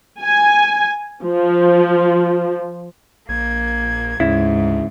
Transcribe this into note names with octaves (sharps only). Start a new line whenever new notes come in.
G#5
F3
A#1 A#3 G#6
D2 G#2 C#3 E4